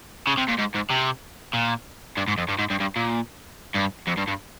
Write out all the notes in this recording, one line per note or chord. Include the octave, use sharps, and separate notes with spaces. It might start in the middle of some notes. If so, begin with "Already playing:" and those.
C#3
C3
A#2
G#2
G#2
C3
A#2
G2
G#2
F2
G2
G#2
G2
G2
A#2
G2
F2
G2
G2